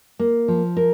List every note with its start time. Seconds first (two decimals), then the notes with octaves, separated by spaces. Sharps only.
0.19 A#3
0.48 F3
0.77 A#4